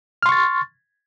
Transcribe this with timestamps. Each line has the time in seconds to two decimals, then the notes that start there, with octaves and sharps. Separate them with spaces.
0.23 F6
0.26 C6
0.29 C#6
0.32 A6